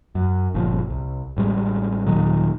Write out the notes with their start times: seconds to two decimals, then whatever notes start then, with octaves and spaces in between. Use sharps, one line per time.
0.15 F#2
0.54 G1 A#2 F3
0.90 C2
1.37 A1 A2 G3 G#3
2.06 D#1 A#2 D#3 F#3